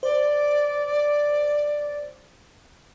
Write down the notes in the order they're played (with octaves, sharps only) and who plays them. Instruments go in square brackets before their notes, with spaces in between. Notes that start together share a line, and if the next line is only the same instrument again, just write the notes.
[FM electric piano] C5 [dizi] D5